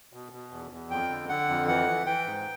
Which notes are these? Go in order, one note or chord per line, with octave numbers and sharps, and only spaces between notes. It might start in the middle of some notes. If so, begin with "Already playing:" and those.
B2
B2
E2
E2
F2 G5
D3
D3 F#5
F2
E3 F#5
E3
E3 G5
G#2